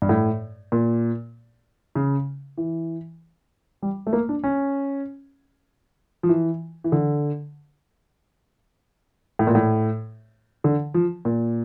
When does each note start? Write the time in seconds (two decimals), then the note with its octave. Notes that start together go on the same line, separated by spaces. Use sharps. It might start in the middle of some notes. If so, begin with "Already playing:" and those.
0.02 G2
0.09 A2
0.72 A#2
1.95 C#3
2.58 E3
3.82 G3
4.07 A3
4.13 A#3
4.29 D4
4.44 C#4
6.23 F3
6.29 E3
6.84 E3
6.92 D3
9.39 A2
9.47 A#2
9.55 A2
10.64 D3
10.94 F3
11.25 A#2